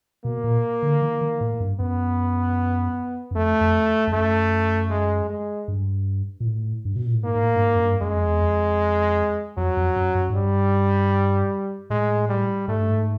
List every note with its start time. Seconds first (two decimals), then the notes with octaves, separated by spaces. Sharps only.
0.24 B2 A#3
0.44 A#2
0.82 D3
1.02 D#3
1.21 D#3
1.40 A2
1.60 G2
1.79 F#2 B3
3.31 F#2
3.35 F2 A3
3.61 F2
4.07 F2
4.13 F#2 A3
4.90 G#3
5.30 G#3
5.68 G2
6.40 A#2
6.46 A2
6.85 G2
6.96 B2
7.05 A#2
7.14 A2
7.24 G#2 A#3
7.35 G#2
7.43 A2
7.55 G2
7.63 G#2
7.75 F#2
7.82 G2
8.01 F#2 G#3
8.15 F2
8.28 E2
8.41 F2
9.57 F2 F#3
9.77 F2
9.96 F#2
10.15 F#2
10.30 G#2
10.34 G2 G3
11.90 A2 G#3
12.29 G3
12.68 G#2 A3
12.80 G2
12.90 G#2